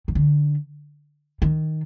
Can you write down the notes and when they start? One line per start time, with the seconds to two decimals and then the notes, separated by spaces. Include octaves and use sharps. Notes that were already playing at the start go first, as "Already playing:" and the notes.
0.08 D#3
0.15 D3
1.42 D#3